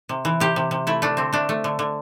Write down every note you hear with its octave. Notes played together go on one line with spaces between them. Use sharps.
C3
E3
C3 G4
C3
C3
A3 E4
A3 D4
D3 C4
A3 D4
A3
D3
D3